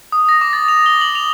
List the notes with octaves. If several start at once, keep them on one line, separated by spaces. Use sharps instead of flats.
D#6
A#6
D6
A6
F7
G7
F#7
F7